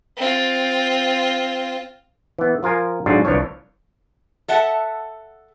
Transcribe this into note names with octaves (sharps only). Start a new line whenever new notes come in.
C4 F4
E3 B3
F3 F4 A#4 G#5
G#2 D3 F#3 D4 F4 F#4
C2 E3 F3 D4 C#5
A4 E5 F#5 A5